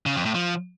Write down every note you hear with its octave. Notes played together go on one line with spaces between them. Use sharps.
C#3
F2
A2
F3